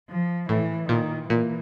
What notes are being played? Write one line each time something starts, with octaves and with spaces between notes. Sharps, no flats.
F3
A2 E3
A#2 D#3
A#2 E3